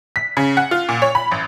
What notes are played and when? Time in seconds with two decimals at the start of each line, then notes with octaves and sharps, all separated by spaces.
0.16 B6
0.37 C#3
0.57 F#5
0.71 F4
0.89 A#2
1.02 C#5
1.15 B5
1.31 A1